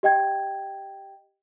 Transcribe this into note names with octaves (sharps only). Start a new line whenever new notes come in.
G4 D#5 G5 G#6